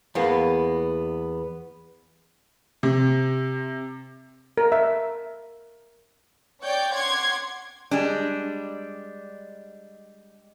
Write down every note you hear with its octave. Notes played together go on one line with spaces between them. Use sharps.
E2 A#3 B3
C3
A#4
E5
C#5 D5 G5 G6
C#5 F#5 C6 D6 G#6
G3 G#3 D4